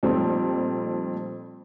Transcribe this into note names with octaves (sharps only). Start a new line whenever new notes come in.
F2 A#2 G3 A3 C4 D#4